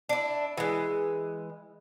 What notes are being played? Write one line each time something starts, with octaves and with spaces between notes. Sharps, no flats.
D4 E4
E3 G#3